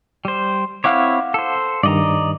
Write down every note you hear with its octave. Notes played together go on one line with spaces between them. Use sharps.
G3 C5
C4 E4 C#5 F5 F#5 D6
A4 C5
G2 D#3 D5 D#5 A#5